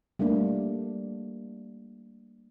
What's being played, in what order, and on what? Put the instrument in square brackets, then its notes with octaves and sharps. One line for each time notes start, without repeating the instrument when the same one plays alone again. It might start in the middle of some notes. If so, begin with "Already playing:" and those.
[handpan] G3 A3 A#3 D4